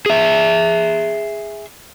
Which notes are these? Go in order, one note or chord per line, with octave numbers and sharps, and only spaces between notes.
G#4 E5